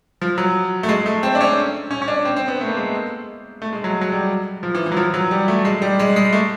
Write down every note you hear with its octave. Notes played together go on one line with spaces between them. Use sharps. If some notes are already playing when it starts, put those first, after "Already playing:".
F3
F#3
A3
G#3
A3
C4
D4
C#4
C#4
C#4
D4
C4
C4
B3
A3
A#3
G#3
A3
G#3
F#3
F#3
G3
F3
E3
E3
F#3
F3
F#3
G3
A3
G#3
G3
G#3
G#3
A3